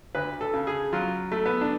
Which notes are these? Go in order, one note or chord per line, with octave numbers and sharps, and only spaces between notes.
D2 B4
A4
C#3
G#4
F#3 F4
A3
B3
D4